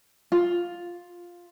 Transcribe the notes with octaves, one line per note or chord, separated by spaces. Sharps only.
F4